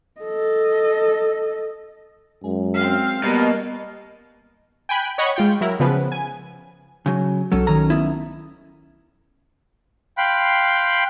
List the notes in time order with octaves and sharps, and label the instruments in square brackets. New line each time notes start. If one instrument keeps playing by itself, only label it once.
[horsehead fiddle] A4 D#5
[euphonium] F#2 [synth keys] G#3
[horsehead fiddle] C4 F5
[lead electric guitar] B2 [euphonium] G3 [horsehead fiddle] A#3 [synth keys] D#5
[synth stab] G5 G#5 B5 F#6 D7
C#5 D#5 F#5 B5 C#6
G#3 F4 G5
F#3 E4 A#4
C#3 F3 B3 B4
G#5
[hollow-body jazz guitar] C#3 F#3
[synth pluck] B1 C#4 A4 [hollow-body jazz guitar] F#3
[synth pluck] D#3 F#3 C#4 [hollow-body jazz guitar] A#5
[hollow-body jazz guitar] B3 E4
[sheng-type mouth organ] F5 G5 B5 C6 F#6